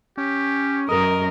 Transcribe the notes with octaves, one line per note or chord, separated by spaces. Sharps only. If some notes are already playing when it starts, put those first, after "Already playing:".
C#4 G4
F#2 A#4 D#5